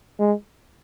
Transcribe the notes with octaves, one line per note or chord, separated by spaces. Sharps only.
G#3